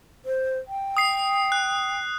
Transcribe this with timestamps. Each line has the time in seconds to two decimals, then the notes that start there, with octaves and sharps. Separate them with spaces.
0.25 C5
0.68 G5
0.97 D#6 C7
1.52 F#6